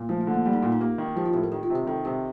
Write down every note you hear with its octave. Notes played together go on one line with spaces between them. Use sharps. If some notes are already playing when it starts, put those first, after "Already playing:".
Already playing: A#2
F3 A3
A3
D3
A#3
G3 A#3
D#4
A#2 F4
D#4
A#3 G4
D#3
F3 G4
F4
A2 G4
A#4
D#3 G4
F4
C3
G4
D#3 A4
C3 G4